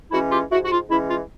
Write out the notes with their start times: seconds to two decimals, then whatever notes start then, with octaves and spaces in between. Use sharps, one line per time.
0.11 E3 G#3 C#4 E4 F#4
0.31 F4 G4
0.51 G#2 E4 F#4
0.65 F#4
0.71 F4
0.90 E3 G#3 C#4 E4
1.09 F4